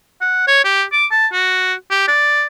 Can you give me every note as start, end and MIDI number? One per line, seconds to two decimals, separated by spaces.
0.21 0.46 78
0.47 0.61 73
0.64 0.83 67
0.92 1.06 86
1.11 1.27 81
1.33 1.74 66
1.91 2.05 67
2.08 2.45 74